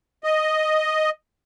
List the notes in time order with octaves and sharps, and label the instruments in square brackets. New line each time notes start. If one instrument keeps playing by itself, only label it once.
[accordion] D#5